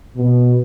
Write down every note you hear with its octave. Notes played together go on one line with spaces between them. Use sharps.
B2